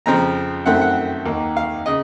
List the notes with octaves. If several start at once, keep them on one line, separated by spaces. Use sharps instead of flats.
F2 C#3 F3 C4 A#5
F#2 D#3 A3 C4 F#5
F#5
D#2 D#3 A#3
F5
C#3 D#5